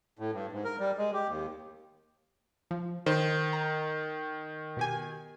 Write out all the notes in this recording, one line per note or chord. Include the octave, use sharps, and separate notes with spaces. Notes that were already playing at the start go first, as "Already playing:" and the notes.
A2
G2
G#2
A#4
G3
G#3
G4
D#2
F3
D#3 C5
A#5
B2 G4 G#5